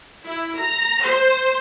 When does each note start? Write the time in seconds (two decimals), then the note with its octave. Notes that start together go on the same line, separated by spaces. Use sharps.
0.24 E4
0.55 A#5
1.01 C5